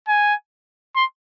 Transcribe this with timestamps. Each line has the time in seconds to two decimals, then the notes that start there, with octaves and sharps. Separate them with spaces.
0.08 G#5
0.96 C6